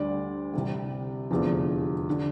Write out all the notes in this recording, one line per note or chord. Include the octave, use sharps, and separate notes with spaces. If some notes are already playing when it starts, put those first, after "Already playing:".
Already playing: D2 D3 G3 D5
C2 C3 G3
F1 E2 D3 F3
D3